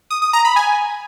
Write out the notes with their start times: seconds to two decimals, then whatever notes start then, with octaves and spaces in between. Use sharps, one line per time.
0.10 D#6
0.22 D#6
0.33 A#5
0.45 B5
0.56 G#5